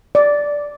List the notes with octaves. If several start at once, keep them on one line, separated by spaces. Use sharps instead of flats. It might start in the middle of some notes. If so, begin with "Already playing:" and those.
D5